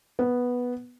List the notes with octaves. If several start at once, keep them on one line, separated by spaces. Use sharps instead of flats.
B3